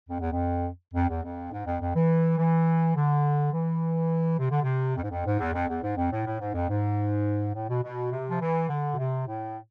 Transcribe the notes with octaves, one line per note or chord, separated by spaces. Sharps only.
F2
E2
F2
F2
E2
F2
G#2
F2
F2
E3
E3
D3
E3
C3
D3
C3
F2
G#2
F2
G#2
E2
F2
E2
G#2
F2
A2
A2
G#2
F2
G#2
A2
B2
B2
C3
F3
E3
D3
B2
C3
A2